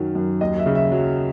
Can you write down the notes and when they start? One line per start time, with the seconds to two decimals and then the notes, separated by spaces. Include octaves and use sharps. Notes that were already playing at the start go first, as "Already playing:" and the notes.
Already playing: F#2 D#3 F#3
0.15 F#2
0.41 D#2 D#5
0.58 E5
0.66 C#3
0.75 E5
0.92 F#3